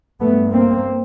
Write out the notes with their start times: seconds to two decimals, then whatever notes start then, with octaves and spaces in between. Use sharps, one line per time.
0.21 G2 A3 B3
0.51 A#3 C4